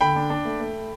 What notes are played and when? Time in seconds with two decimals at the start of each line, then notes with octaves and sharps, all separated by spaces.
0.01 D3 G5 B5
0.16 D4
0.30 D4
0.45 A3
0.60 A3